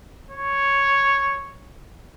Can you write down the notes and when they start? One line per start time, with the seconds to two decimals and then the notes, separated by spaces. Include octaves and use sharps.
0.31 C#5